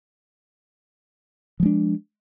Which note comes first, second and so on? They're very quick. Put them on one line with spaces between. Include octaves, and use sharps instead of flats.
F3 G#3 D4